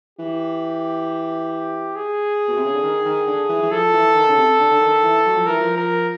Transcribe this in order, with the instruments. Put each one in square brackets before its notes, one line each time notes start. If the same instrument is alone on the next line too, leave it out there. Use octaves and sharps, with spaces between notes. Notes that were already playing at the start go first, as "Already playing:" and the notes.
[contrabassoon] E3 [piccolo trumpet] G4
[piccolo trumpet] G#4
[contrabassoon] B2
C3
C#3
D3
D#3
D#3
D3
E3
E3
[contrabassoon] F3 [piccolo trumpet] A4
[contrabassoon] E3
D#3
C#3
C3
D3
D3
D#3
E3
F#3
F3
[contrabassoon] E3 [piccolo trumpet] A#4
[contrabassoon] F3
[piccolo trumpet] A#4